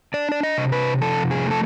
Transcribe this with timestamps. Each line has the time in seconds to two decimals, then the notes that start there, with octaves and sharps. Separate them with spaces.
0.14 D4 D5
0.32 D5
0.43 D#5
0.58 C3
0.72 B4
1.01 F3 A4
1.31 G#4
1.46 A3
1.51 A4